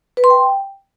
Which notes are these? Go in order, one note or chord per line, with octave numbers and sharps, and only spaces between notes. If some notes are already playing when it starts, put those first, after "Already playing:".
B4
C6
G5